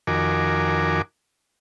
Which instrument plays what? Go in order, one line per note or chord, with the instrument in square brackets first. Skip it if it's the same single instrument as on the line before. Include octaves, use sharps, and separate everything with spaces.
[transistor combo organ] F2 D#3 F#4 A#4 G#5 D6